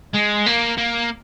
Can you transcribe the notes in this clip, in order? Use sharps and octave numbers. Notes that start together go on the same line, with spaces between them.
G#3
A#3
A#3